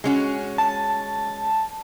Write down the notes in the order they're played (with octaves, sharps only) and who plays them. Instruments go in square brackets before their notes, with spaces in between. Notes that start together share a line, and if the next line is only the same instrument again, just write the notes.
[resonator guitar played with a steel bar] G#3 C#4 F#4
[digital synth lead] A5